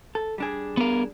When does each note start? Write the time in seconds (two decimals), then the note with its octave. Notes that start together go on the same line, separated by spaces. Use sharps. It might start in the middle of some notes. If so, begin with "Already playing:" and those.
0.15 A4
0.38 G3 D4 G#4
0.77 B3 A#4